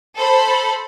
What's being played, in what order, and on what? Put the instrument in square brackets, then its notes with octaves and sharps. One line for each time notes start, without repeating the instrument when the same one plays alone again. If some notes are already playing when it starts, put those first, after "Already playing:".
[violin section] A4 C5 B5